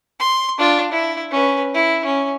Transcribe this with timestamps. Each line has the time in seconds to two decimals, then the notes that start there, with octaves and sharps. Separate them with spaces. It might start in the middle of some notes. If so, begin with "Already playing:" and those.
0.20 C6
0.58 D4 F4
0.92 E4
1.31 C#4 B4
1.74 E4
2.05 C#4